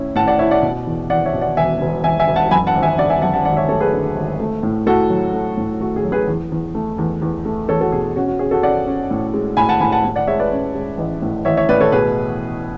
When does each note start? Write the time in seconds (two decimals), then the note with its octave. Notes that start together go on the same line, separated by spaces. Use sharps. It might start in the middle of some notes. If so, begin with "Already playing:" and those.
Already playing: A2 C#4 E4
0.15 A2 F#5 A5
0.28 D5 F#5
0.39 E4 C#5 E5
0.51 D5 F#5
0.62 B2
0.87 E2
1.10 E2 D5 F#5
1.25 C#5 E5
1.34 B2
1.41 D5 F#5
1.57 E1 E5 G#5
1.81 E1
2.04 E1 E5 G#5
2.20 E5 G#5
2.28 E1
2.36 F#5 A5
2.51 F#2 G#5 B5
2.67 F#5 A5
2.75 G#1
2.82 E5 G#5
2.98 D3 D5 F#5
3.10 E5 G#5
3.22 F#2 F#5 A5
3.34 F#5 A5
3.45 G#1 D5 F#5
3.57 C#5 E5
3.68 A3 A4 C#5
3.80 G#4 B4
3.93 D3
4.16 G#1
4.40 A3
4.63 A2
4.86 A2 F#4 A4
5.10 F#3
5.33 A3
5.57 A2
5.80 A3 F#4
5.96 G#4
6.04 F#3
6.12 G#4 B4
6.28 E2
6.52 E2
6.75 A3
6.98 E2
7.22 E2
7.45 A3
7.69 E2 A4 C#5
7.81 F#4 A4
7.92 B2 G#4
8.16 C#4 F#4
8.27 F#4
8.39 C#4 G#4
8.51 F#4 A4
8.63 C#4 D5 F#5
8.86 C#4
9.11 A2
9.34 G#3
9.57 A2 G#5 B5
9.69 F#5 A5
9.80 A2 G#5 B5
9.92 F#5 A5
10.04 A2
10.16 D5 F#5
10.27 G#3 C#5 E5
10.39 B4 D5
10.51 C#4
10.75 G#3
10.98 A1
11.22 A2
11.45 A1 C#5 E5
11.57 C#5 E5
11.69 A2 B4 D5
11.81 A4 C#5
11.92 B2 G#4 B4